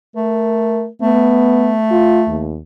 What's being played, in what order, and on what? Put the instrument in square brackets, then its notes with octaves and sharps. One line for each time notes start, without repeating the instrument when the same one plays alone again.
[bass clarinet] A3 [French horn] A#4
[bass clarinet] A3 [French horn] B3
[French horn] F4
D#2